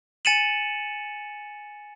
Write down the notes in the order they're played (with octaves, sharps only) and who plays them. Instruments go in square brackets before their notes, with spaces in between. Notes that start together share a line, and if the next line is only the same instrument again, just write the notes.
[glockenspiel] G#5 A6 C#7 D#7 E7 F#7